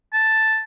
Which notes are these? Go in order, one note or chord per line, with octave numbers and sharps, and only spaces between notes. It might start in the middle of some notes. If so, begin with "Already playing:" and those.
A5